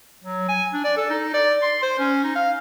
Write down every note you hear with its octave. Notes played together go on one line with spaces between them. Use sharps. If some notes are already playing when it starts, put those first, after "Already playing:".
F#3
G#5
D4
D5
A4
D#4
D5
C6
C5
C#4
D#4
F5